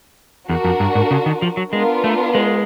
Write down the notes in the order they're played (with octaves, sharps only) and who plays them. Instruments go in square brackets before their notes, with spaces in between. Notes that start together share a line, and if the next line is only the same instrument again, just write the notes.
[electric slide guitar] E2 [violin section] D4 F#4 A#4
[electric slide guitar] F2
G2
G#2
C#3
D#3
F3
F#3
[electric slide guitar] G#3 [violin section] B3 D4 F4 A#4
[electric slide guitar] A3
G#3